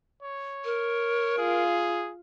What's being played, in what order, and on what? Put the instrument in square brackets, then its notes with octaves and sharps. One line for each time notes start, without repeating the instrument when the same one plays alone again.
[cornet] C#5
[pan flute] A#4
[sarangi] F4 [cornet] G#4